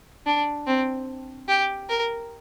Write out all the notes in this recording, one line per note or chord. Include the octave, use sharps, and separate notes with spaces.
D4
C4
G4
A#4